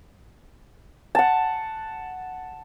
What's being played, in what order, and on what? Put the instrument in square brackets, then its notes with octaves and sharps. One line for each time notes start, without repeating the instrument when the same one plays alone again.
[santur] F#5 A5